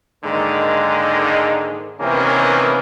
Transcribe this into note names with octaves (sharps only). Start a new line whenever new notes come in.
G#2 D3 D#3 G#3 A#3 D#4
C3 D#3 E3 A#3 B3 C#4